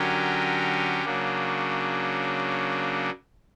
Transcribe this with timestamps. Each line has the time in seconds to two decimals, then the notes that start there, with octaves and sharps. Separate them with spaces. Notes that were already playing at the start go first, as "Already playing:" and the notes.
Already playing: D3 F#3 C#4 G4 A#4
1.04 C#3 F#3 A#3 D4